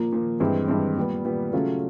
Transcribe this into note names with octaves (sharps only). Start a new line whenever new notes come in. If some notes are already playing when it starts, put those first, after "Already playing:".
Already playing: A#2 F3 A#3
A#2 F3 A#3
G2 E3 G#3 C4
G2 E3 G#3 C4
A#2 G3 B3
A#2 G3 B3
C#3 F#3 A3 C#4 F4